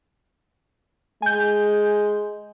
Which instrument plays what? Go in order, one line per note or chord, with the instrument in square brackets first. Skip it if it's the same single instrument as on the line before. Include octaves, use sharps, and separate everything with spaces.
[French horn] G#3 [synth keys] G#5 G6